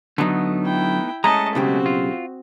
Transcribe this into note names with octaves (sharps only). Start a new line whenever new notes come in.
D3 F#3 A3 B3 D#4
E4 G5
G#3 A3 C#4 D#5 A5 A#5
B1 C#3 C4 F#4 G4
F4